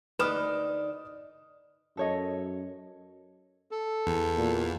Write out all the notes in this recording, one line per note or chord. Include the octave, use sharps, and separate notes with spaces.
D2 D#4 B4 D5 D#6 F6 E7
F#2 A4 C#5 D#5
A4
E2
A#2